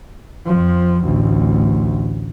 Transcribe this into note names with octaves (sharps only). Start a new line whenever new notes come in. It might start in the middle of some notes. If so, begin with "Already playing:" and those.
F2 F3
A1 D2